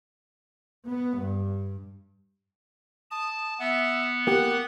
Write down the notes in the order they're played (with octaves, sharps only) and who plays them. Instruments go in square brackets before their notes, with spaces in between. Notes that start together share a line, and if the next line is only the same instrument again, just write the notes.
[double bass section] B3
G2
[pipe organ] A5 [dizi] D#6
[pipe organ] B3 [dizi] E5
[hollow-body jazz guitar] A#3 G4 [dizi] F#5